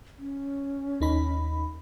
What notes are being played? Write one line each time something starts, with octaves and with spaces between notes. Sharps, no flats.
C#4
D#2 D#4 B5